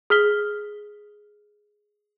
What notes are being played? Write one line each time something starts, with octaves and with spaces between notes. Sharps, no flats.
G#4 F6 B6 G7